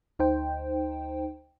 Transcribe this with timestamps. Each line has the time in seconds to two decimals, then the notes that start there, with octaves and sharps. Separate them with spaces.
0.19 D2 D#4 C5 G5